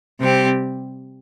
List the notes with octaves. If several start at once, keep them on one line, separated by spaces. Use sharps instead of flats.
C3 G3 C4 G4